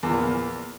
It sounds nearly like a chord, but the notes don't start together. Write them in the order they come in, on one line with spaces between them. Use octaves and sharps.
E2 F3 A#2